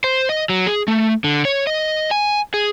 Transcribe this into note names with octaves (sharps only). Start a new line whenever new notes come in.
C5
D#5
F#3
G#4
A3
D3
C#5
D#5
G#5
G#4